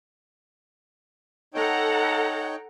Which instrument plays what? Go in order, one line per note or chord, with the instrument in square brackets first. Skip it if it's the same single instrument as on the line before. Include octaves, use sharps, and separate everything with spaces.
[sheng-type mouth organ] D#4 C#5 G5 [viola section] A4 F#5 A#5